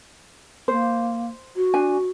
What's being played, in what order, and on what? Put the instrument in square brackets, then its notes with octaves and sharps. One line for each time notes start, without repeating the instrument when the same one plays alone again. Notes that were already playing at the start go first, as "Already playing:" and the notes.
[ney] A#3 [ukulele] C5
[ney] F#4
[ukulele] D4 G#5